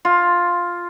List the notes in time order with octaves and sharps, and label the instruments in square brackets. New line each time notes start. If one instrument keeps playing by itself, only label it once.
[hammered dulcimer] F4